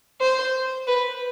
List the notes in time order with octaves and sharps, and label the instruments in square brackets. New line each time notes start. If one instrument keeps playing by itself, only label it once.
[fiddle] C5
B4